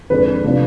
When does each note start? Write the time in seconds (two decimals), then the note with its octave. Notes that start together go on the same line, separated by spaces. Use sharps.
0.10 F2 D3 G#3 D4 B4
0.44 C3 F3 B3 D4